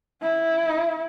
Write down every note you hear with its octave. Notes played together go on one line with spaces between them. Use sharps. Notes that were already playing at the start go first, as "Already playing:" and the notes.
E4